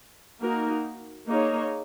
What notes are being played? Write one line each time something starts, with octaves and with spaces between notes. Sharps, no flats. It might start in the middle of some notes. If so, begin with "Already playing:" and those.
A#3 D#4 F#4 A#4
A#3 D#4 G#4 C#5